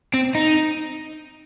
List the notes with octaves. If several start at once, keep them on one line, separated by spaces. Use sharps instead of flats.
C4
D#4